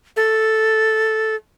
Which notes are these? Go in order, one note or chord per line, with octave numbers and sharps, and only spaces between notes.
A4